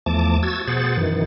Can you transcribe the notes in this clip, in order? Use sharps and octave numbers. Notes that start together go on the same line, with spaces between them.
E2 F3 A3 A5 D6
F#4 E6 G#6 A6
B2 G#4 C5 F#5 A6
F#2 D#3 E3